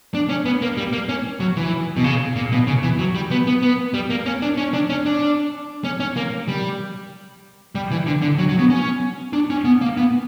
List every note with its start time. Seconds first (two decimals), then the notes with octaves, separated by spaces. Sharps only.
0.14 D4
0.29 C#4
0.45 B3
0.62 A#3
0.77 G3
0.93 A#3
1.09 C#4
1.40 F#3
1.57 E3
1.97 B2
2.04 C#3
2.36 A#2
2.52 B2
2.67 C#3
2.83 E3
2.99 F#3
3.15 G3
3.31 B3
3.47 B3
3.62 B3
3.94 G3
4.10 A#3
4.26 C#4
4.42 D4
4.57 C#4
4.74 D4
4.90 C#4
5.06 D4
5.84 C#4
6.00 C#4
6.17 A#3
6.48 G3
7.75 G3
7.91 E3
8.07 D3
8.22 D3
8.38 F#3
8.49 F#3
8.59 B3
8.70 C#4
9.33 D4
9.50 C#4
9.65 B3
9.82 A#3
9.97 B3